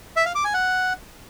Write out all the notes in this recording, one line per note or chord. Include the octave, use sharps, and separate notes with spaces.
E5
F5
D6
G#5
F#5